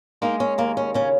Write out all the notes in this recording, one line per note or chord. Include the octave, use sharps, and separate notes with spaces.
G#3 A#3 D#4
C#4
D#2 A#3
C#4
C#3 C#4